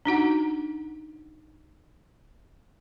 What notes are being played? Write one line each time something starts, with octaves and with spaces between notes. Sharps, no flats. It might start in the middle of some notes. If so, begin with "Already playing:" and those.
D4 D#4 F#4 F#5